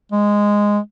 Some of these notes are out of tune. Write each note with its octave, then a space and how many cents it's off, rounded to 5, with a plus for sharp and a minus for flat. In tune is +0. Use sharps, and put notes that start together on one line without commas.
G#3 -10